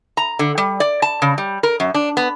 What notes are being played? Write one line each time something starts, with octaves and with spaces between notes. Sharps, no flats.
A#5
D3
G3
D5
A5
C#3
G3
A#4
F#2
D4
B3